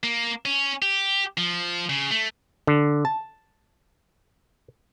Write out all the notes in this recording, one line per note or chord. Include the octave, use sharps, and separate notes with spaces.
A#3
C#4
G4
F3
C#3
A3
D3
A5